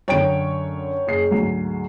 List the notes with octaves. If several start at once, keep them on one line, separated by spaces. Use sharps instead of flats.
F#2 D3 C#5 G5 D7
F#1 G#4 C7
D2 G#2 F#3